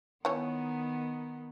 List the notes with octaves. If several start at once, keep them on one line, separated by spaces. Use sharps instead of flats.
D#3 E3 B3 D#4 C#5